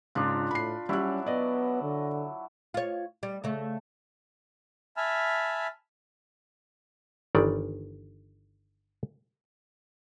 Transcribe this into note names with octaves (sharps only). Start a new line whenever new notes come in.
G#2 C#3 D4 F4 F#6
A2 B5 C7
F#3 G3 C#4 E4 F#6
B3 D5 D#5
D3
F4 C#5
G3
C#3 A3
E5 G#5 A5 B5 F6
G1 D#3 E3 D5